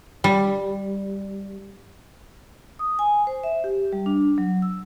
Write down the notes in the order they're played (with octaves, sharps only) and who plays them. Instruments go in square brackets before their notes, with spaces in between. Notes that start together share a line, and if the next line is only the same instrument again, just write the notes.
[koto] G3
[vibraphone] D#6
G#5
C5
E5
G4
G3
D4
F#3
E6